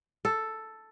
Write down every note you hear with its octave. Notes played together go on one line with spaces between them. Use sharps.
A4